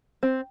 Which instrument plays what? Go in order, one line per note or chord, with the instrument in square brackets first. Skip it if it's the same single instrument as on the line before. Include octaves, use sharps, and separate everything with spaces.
[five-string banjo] C4